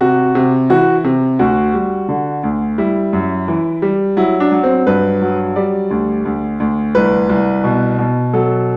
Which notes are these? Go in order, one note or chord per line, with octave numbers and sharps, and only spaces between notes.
C3 F#4
C3
E3 F#4
C3
D2 F#4
G3
D3
D2
G3 E4
F#2
E3
G3
F#3 E4
D4
F#3
C4
G2 B4
F#3
G3 D5
D2
D2
D2
C2 B4
C2
B2
B2
F#3 A4